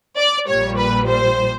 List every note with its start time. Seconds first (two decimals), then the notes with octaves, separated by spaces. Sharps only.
0.17 D5
0.48 A#1 A#2 G3 C#5
0.78 B4
1.09 C5